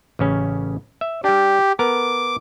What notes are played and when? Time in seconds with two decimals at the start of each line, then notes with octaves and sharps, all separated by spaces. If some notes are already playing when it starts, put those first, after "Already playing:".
0.19 A1 C#3 C#4
1.01 E5
1.24 G3 D4 G4
1.79 B3 A4 A#4 D6